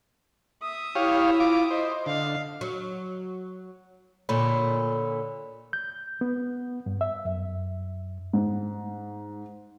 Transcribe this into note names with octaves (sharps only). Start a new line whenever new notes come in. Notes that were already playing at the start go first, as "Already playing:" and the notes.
E5 D#6
E4 G4 C#5 F5
F4 D6
C5 D#5
D3 F5
F#3
A#2 D3 C#5 B5
G6
B3
G2
E5
F#2
G#2